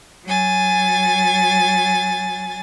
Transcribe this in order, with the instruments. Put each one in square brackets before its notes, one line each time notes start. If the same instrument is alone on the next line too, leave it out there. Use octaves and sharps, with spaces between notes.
[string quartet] F#3 G#5 A6